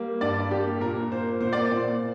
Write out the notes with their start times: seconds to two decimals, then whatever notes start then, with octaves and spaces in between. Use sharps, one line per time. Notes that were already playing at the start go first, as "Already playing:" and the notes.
Already playing: G3 A#3
0.21 G2 D5
0.51 A#3 G4
0.81 A#2 A#4
1.10 A#3 C5
1.40 A#2 C5
1.53 D5
1.63 C5
1.72 A#2